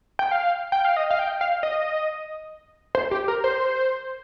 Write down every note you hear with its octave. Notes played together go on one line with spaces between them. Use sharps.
G5
F5
G5
F5
D#5
F5
G5
F5
D#5
C5
G4
A#4
C5